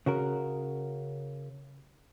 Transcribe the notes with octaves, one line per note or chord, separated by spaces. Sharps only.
C#3 F#4 A#4